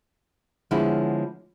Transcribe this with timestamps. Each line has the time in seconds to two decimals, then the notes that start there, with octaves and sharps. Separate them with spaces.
0.71 D3 F3 G#3 B3 C#4 E4